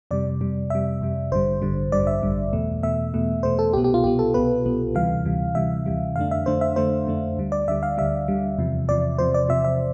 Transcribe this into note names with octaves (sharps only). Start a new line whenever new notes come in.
F2 C3 G3 D5
F2 C3 G3
F2 C3 G3 E5
F2 C3 G3
A1 G2 D3 G3 C5
A1 G2 D3 G3
A1 G2 D3 G3 D5
E5
A1 G2 D3 G3
E2 B2 A3
E2 B2 A3 E5
E2 B2 A3
E2 B2 A3 C5
A4
C2 B2 B3 G4
G4
F4
C2 B2 B3 G4
A4
C2 B2 B3 B4
C2 B2 B3
D2 C3 E3 G3 F5
D2 C3 E3 G3
D2 C3 E3 G3 E5
D2 C3 E3 G3
F2 D3 A3 D4 F5
E5
F2 D3 A3 D4 C5
E5
F2 D3 A3 D4 C5
F2 D3 A3 D4
D2 D3 G3
D5
D2 D3 G3 E5
F5
D2 D3 G3 E5
D2 D3 G3
E2 C3 F3
E2 C3 F3 D5
E2 C3 F3 C5
D5
E2 C3 F3 E5
E5